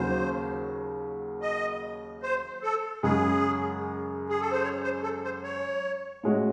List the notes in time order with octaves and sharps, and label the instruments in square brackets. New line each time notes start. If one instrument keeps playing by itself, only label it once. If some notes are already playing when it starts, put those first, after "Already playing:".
Already playing: [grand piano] D#2 C#3 F#3 [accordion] C5
[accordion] D#5
C5
A4
[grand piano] F#2 C#3 G#3 [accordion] G#4
[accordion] G#4
A4
C5
C#5
C5
A4
C5
C#5
[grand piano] A2 G#3 C#4 F#4